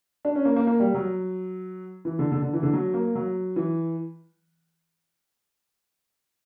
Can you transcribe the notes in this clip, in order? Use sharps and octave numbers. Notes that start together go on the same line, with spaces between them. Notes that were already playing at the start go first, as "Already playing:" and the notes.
D4
C#4
A#3
A#3
A#3
G3
F#3
E3
D3
D3
D3
E3
D3
F#3
A#3
F#3
E3